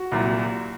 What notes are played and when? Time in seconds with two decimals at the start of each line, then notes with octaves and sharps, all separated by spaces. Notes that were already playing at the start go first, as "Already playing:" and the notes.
Already playing: F#4
0.12 C2 A#2 F#3